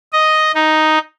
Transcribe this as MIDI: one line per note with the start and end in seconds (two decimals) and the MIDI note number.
0.13 0.51 75
0.54 0.98 63